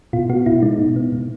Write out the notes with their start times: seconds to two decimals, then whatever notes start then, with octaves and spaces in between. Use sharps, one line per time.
0.13 B2 F4
0.30 B3 F#4
0.46 B2 E4
0.62 G#3 D#4
0.79 B2
0.96 B3
1.12 B2